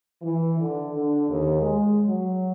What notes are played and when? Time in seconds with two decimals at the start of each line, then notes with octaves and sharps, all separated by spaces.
0.22 E3
0.59 D3
0.93 D3
1.29 D#2
1.60 G#3
2.05 F#3